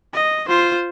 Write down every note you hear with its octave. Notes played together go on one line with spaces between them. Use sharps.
D#5
F4 C5